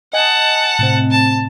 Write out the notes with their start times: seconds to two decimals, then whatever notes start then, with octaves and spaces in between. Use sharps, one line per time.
0.13 D#5 F#5 G#5 A5
0.79 A2 C3 C4
1.11 A5